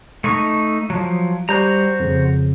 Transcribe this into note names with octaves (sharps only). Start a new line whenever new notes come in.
A3 D#4 C#6
F3 F#3
G3 F#4 C5 A#5
F2 C#3